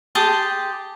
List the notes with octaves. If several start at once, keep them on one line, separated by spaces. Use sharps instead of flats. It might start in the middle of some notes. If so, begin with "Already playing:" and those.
G4 G#4 A5 C6